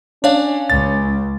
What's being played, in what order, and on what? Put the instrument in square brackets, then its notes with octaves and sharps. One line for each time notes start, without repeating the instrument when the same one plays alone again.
[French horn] C#4 [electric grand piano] D4 [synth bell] C#5 F5
[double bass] C#2 [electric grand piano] A6